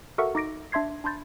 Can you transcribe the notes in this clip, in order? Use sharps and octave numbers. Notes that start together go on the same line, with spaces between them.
F#4 A4 A#4 E5 F#5 C#6
D#4 D6 A#6 D7
D4 E5 C6 G#6 C7
D4 B5 C6 G6 A6